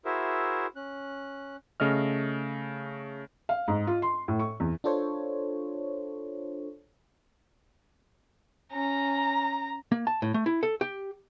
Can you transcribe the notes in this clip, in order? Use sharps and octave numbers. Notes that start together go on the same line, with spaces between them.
E4 F#4 G#4 A#4 C5 E5
C#4 F#6
C#3 A3 D#5 F6
F5
G#2
F4
C6
A2
C#6
E2
D4 F4 A4 C5 C#5
C#4 A#5
A#3
A5
A2
A3
E4
A4
G4